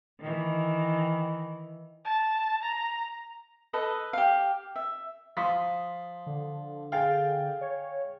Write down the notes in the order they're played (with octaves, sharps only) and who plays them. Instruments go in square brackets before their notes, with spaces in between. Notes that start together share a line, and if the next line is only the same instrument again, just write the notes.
[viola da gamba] D#3 E3
[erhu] A5
A#5
[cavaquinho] A4 B4 D#5
G4 F5
E5
[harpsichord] F3 [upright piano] C6 D#6 B6
[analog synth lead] D3
[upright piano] G#4 G5 A6 [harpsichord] F5
[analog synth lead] C#5